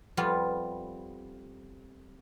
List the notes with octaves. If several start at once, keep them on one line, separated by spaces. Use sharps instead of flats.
F2 G3 B3 F4